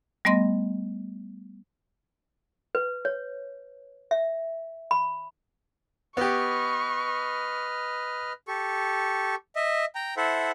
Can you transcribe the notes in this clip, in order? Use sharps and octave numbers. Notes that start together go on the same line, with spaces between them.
G3 A3 B3 D#5 C6 A#6
B4
C#5
E5
B5
B3 G4 B4 D#5 C#6 F6
G4 A4 C#6
D#5 E5
G5 A#5
E4 A4 C5 E5 F#5